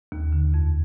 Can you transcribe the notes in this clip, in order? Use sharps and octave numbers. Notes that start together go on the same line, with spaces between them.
D#2
D3
F2